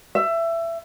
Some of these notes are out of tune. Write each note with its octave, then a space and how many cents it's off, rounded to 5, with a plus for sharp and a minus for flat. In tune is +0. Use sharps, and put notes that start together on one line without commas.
E5 +20